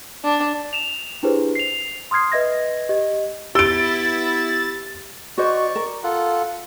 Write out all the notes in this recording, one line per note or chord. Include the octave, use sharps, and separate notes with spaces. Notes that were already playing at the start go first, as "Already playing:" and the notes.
D4
E7 F7
D4 E4 G4 G#4 B4 C5
C7 F7
C6 D#6 F6 G#6 C7
B4 D#5 E5 G#6 A#6
G4 D#5
B3 E4 G4 E6 A6 D7
F#4 C5 D5 D#5 C#6
A#4
F4 A4 F#5